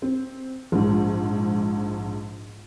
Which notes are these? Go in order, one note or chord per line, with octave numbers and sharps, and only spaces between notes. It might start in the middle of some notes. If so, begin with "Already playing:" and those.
C4
A#1 G#2